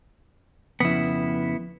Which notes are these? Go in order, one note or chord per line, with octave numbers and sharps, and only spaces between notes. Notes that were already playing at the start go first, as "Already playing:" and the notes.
F2 C#3 F3 B3 E4